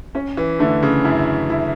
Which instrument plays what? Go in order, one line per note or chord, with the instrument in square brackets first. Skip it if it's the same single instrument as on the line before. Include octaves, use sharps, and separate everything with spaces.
[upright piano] C#4
[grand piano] E3
[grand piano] D3 [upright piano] A3
[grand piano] C#3
[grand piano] F#2 [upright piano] E4
[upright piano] E4